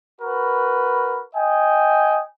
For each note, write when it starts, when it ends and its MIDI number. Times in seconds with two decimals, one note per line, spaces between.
0.21 1.21 66
0.21 1.21 70
0.21 1.21 71
1.35 2.22 75
1.35 2.22 79
1.35 2.22 80